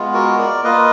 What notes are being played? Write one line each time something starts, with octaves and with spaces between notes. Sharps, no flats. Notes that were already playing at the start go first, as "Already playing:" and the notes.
Already playing: G#3 B3 F4
F#4 A#4
A#4 D5
A#3 F4 B4 D#5